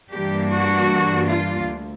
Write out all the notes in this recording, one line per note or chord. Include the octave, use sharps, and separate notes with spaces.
G2 E3 G3 A#3 D4 G4
F#4
F4
D2